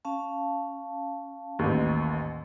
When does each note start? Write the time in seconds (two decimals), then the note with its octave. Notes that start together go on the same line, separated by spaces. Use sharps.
0.05 C#4 F5 A5
1.59 A1 D#2